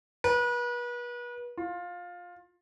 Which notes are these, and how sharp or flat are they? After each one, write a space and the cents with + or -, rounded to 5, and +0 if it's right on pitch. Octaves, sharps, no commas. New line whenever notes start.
B4 -35
F4 +15